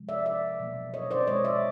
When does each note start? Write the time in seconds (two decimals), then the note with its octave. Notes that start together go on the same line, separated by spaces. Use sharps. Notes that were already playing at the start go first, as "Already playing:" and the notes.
Already playing: C3 F3 G#3
0.09 D5 E5
0.26 D5 E5
0.59 B2 F#3 A#3
0.94 C#5 D#5
1.11 C5 D5
1.27 B2 G#3 C#5 D#5
1.44 D5 E5